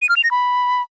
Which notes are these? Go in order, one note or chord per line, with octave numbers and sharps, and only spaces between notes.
D#7
F6
F7
A#6
B5